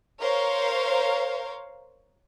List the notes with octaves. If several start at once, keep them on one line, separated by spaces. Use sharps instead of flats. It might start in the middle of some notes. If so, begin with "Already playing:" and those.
A#4 C5 C#5 F5